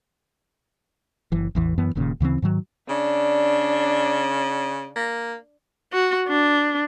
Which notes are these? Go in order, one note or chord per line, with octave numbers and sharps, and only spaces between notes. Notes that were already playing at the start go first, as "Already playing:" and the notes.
F#1 E3
A1 E2 E3
F#2 E3 B3
D#1 D#2 A#2 C#3
D2 C#3 E3 C4
G#2 D#3 F#3
C#3 D4
A#3
F#4
D4